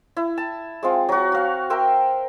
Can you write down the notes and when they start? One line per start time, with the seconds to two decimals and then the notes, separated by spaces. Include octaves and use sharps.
0.16 E4
0.38 A5
0.83 G#3 C4 F4
1.09 F#3 F#4
1.32 F#4 F5
1.70 A#4 E5 G5 C6